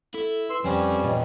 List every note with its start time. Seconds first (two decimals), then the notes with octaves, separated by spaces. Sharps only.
0.14 E4 A4
0.50 B4 C6 E6
0.64 F2 G3 C4 C#4
1.04 E2 A#2 B4 D#5 G5